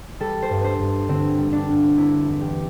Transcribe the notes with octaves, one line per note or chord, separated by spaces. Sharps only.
G3 A4
C5
G2
C5
G2
D3 C4
G3
D4
G2
A3 E4
E2
E4
G4